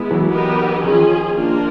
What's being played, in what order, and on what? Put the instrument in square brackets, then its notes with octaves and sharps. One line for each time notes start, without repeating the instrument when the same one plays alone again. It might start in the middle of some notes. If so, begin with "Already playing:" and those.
Already playing: [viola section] G#3 B3 E4
[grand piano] E3 F#3
[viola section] B3 D#4 G4 A#4
[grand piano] D#3 F3 [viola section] C#4 F4 G#4
[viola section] A#3 D4 F4 A#4